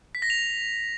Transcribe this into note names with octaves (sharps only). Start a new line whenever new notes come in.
B6
A#6
F7